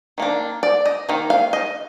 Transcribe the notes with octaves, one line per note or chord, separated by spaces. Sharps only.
D#3 A#3 D4
D5
D#5
D#3 A#3
F5
D#5